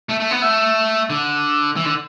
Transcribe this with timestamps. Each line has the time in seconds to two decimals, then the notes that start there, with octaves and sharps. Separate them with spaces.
0.09 A3
0.20 A3
0.31 B3
0.42 A3
1.10 D3
1.76 E3
1.85 D3